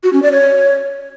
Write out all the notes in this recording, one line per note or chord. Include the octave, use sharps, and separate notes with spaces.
F#4
C#4
D5
C#5